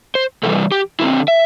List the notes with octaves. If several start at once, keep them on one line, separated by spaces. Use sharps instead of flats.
C5
C3 E3 G3 A4
G4
D3 C4 E4
E5